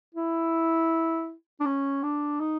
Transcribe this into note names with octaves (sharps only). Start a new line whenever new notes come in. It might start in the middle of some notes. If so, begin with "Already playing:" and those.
E4
D4
C#4
D4
D#4